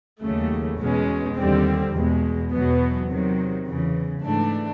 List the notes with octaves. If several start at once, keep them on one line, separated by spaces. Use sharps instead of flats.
D#2 C#3 F#3 A3
E2 B2 G#3 C#4
D#2 D3 G3 C4
E2 B2 G#3
E2 B2 F#3 B3
C3 D#3 F#3
E2 C#3 E3
G#2 E3 A3 D4